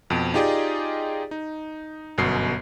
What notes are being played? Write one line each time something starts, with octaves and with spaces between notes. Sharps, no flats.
F2 B2 D7
D#4 F4 G4 G#4 D5 D#5
D#4
G1 F#2 B2 C7